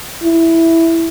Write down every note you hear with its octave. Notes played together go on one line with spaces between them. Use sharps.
E4